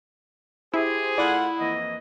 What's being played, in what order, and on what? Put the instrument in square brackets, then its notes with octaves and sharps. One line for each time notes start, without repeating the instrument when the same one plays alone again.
[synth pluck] E4 [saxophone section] G4 C5 [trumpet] G#4
[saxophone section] A3 F4 F#5 [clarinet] E4 [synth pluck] D5
[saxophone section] F2 E3 A#3 [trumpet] D#5